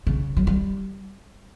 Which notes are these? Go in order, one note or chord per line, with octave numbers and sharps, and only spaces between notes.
C#3
F#3
G3